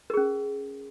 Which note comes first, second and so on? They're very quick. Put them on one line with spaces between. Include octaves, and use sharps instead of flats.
A#4 G#4 C#4